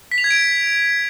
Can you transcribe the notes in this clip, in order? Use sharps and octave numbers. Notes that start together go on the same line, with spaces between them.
B6
F7
G#6
D7